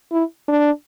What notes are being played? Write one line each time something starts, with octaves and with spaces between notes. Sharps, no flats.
E4
D4